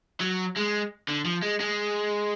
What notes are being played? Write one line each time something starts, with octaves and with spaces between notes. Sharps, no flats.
F#3
G#3
D3
F3
G#3
G#3